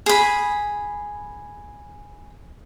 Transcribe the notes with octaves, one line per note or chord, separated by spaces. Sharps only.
G#4 B5